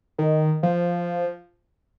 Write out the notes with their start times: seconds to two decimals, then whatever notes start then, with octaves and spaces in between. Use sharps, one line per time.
0.18 D#3
0.63 F3